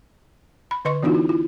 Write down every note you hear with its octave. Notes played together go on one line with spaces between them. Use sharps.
B5
D3 B4 D#5 C6 C#6
E3 B3 D4 D#4 F4 F#4
E4
E4 F4